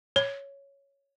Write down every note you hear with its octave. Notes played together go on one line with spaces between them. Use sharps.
C#5